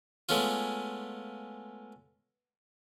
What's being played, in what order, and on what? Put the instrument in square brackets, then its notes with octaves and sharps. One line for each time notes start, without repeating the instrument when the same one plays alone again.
[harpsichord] G#3 A3 B3 C#4 F4